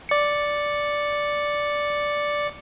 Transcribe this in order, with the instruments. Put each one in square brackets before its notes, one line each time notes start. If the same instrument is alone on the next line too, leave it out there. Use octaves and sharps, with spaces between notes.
[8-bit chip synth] D5 C#7